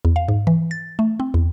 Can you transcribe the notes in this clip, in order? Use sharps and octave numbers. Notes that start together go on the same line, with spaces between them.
E2
F5
G#2
E3
A6
A3
C4
E2